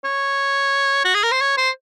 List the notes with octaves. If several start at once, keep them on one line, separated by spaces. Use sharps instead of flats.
C#5
F#4
G#4
A#4
C5
C#5
C5